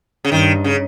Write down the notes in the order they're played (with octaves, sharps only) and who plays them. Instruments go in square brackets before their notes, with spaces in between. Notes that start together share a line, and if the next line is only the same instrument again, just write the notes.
[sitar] C#3
[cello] G2 [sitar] D#3
[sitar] C#3